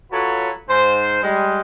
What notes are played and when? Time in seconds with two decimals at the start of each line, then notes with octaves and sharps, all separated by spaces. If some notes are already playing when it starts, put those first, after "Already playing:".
0.11 F#3 F4 F#4 A4 B4 C#5
0.69 G#2 C5
1.22 G3 G#3